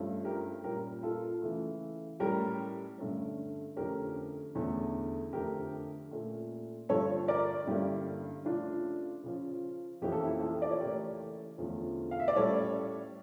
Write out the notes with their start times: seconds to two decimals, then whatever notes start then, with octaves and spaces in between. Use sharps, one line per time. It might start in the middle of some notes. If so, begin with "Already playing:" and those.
Already playing: G2 F3 A3 C#4
0.25 G4 A#4
0.64 A#2 G3 C#4 G4 A#4
1.03 F4 A4
1.42 C#3 E3 A3
2.20 A2 G3 C#4 G4 A#4
2.98 G2 D3 A3 C#4
3.76 F2 D3 A3 C#4 G4 A#4
4.55 E2 D3 A3 C#4
5.33 F2 D3 A3 G4 A#4
6.11 A#2 A3 C#4
6.89 G2 D3 F3 A4 C#5
7.28 A#4 D5
7.67 G2 D3 G3 A#3 C#4 E4 G4
8.45 C#3 F3 A3 C#4 D4 F4
9.23 C#3 F3 C#4
10.02 F2 E3 A#3 C#4 G4
10.12 A4
10.22 E4 G4
10.40 F4 A4
10.62 D5
10.71 C#5
10.80 C#3 E3 A3 C#4 G4 A#4
11.58 E2 D3 F3 A3 C#4
12.11 F5
12.20 E5
12.28 D5
12.36 A2 G3 C#4 A4 C#5